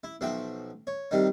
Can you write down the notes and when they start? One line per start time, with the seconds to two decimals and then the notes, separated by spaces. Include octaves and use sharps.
0.04 E4
0.21 B1 F3 F#4 E5 G5
0.87 C#5
1.11 C3 D#3 G3 D#4